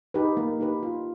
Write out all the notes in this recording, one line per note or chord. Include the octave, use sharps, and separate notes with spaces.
D#4 G4 B4
A#3
D#4 G4 B4
F4